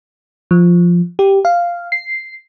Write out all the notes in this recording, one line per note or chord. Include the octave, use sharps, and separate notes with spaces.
F3
G4
F5
C7